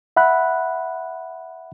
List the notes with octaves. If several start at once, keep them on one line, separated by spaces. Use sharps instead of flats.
E5 F#5 B5 F#6